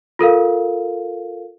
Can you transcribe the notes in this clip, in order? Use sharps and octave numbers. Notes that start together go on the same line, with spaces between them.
F4 A4 A#4 F5